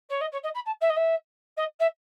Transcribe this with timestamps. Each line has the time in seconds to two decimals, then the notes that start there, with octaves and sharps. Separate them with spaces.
0.09 C#5
0.21 D#5
0.32 C#5
0.43 D#5
0.54 B5
0.65 A5
0.81 E5
0.89 D#5
0.96 E5
1.57 D#5
1.79 E5